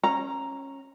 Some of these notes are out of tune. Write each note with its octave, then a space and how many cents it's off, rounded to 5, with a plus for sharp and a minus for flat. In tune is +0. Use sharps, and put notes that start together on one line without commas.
C#4 -20 A#5 +0